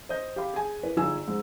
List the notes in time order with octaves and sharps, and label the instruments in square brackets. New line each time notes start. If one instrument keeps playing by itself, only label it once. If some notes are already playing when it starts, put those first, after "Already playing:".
[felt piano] C5 D#5 G6
G4 F5 B5
G#4 G#5
E4 B4
G1 D#4 F4 G#4 G#5 E6
G#2 G#3